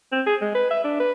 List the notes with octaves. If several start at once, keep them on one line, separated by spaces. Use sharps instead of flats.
C4
G#4
G#3
B4
E5
D4
B4